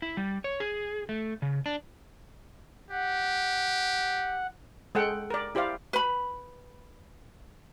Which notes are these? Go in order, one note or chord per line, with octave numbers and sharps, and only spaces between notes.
E4
G3
C#5
G#4
A3
C#3
D4
G4 F#5
G#3 A4 F#5 G5
A#4 D5
E4 G4 C5 D5 F5
B4 B5